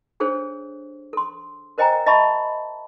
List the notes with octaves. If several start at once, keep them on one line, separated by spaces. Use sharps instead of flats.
D4 G#4 A4 C5 C#5
A4 C6
A#4 C5 D#5 G5 G#5 A#5
D#5 E5 A5 B5 C#6